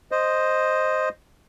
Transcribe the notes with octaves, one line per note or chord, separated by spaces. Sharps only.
C5 D#5